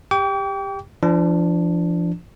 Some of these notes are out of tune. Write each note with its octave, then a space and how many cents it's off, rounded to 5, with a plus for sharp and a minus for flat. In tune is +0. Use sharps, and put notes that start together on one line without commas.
G4 +20 G5 +0 D6 -45
F3 -35 D4 +0